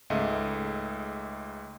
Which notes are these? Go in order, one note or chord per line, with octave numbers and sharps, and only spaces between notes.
C#2 G#2 A3 D#5 E5